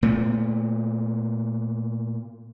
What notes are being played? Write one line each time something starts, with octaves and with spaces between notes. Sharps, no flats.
A#2 A3 B3